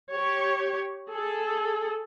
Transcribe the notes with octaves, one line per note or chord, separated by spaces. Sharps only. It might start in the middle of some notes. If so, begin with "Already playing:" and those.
G4 C#5
G#4 A4